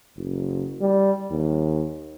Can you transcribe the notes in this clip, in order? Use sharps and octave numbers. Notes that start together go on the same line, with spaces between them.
F#1
G3
D#2